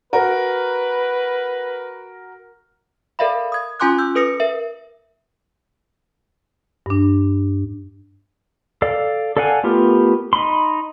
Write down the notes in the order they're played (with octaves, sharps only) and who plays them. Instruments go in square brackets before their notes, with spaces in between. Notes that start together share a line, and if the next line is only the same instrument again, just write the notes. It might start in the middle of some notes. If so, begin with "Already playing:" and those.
[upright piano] F#4 A#4 [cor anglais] B4
[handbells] A4 A#4 D5 E5 F5 B5
D#6 G#6
C#4 F4 G#5 C6 D6 F#6
E6 G6
A4 B4 D#6 A#6 C#7
A#4 E5
[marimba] G2 D4
[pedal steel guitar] A4 D5 F5
A4 D5 F5 F#5 G#5
A3 B3 F4 G4 A#4
D#4 B5 C6